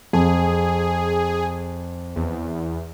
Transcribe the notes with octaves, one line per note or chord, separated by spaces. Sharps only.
F2 G#4
E2